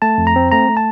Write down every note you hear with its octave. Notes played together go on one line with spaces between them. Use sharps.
A3 A5
F2
A#5
C4
A3 A#5
A3
A5